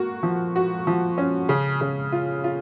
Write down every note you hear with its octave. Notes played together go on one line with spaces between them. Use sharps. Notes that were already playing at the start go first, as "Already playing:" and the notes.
Already playing: A#3 F#4
F3
F#4
F3
C#4
C#3
C#3
F4
F4